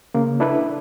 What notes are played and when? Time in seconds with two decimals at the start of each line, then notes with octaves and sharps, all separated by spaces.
0.14 C#3 A#3
0.40 D4 E4 A4 B4